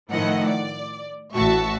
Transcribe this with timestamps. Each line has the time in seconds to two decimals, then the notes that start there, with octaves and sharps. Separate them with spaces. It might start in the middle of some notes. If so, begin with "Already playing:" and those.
0.12 A2 D#3 F3 E4 D#5 F#5
0.47 D5
1.35 A1 A2 F#4 E5 A5 C#6